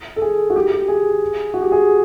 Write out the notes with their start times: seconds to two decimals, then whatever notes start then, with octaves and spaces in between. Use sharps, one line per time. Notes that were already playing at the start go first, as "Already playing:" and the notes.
0.16 A4
0.22 G#4
0.50 F#4
0.56 G4
0.72 G4
0.88 G#4
1.54 F#4
1.62 G4
1.72 G#4